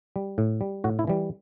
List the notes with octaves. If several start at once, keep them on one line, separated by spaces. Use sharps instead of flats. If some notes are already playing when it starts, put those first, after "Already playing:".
G3
A2
G3
A2 F#4
E4
E3 G3